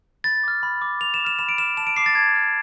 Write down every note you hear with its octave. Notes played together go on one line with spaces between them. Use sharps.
B5 A6
D6 F6
B5
D6 F6
B5 F7
E7
D6
F6 E7
B5 E7
D7
D6 F6 E7
A5 E7
D7
D6 F6 C7
A6
A5 G#6
D6 F6